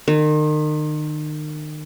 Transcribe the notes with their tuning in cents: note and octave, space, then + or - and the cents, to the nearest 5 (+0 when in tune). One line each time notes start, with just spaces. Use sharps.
D#3 -35